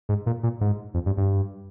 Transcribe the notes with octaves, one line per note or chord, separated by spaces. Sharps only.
G#2
A#2
A#2
G#2
F2
G2
G2